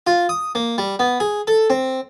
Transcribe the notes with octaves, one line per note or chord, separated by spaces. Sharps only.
F4
D#6
A#3
G3
B3
G#4
A4
C4